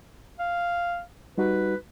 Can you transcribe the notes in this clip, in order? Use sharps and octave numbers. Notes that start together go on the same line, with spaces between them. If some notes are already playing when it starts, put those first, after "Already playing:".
F5
G3 D#4 F#4 B4